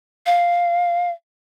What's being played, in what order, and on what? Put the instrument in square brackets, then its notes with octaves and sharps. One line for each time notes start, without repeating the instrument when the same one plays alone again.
[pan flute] F5